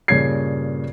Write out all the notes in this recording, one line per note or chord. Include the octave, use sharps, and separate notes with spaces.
G2 A#2 C#3 C#5 G#6 C7